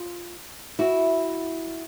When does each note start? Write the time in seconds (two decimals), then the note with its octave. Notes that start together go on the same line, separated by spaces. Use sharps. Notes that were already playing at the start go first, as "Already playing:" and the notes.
Already playing: F4
0.79 E4 F#4